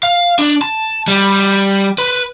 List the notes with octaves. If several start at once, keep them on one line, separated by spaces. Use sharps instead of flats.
F5
D4
A5
G3
B4